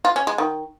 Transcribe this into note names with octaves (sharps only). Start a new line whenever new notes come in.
F4
C#4
G#3
D#3